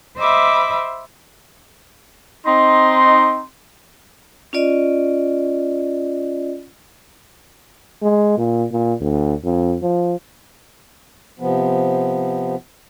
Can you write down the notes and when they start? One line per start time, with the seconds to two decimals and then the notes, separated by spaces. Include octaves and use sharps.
0.17 C5 D#5 E5 B5 D6
2.46 C4 D#4 C6
4.53 C#4 F4 D5 D#5
8.02 G#3
8.38 A#2
8.71 A#2
9.01 D2
9.44 F2
9.82 F3
11.40 C3 F3 B3